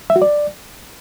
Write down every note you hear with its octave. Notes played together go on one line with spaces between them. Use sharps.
E5
F#4
D5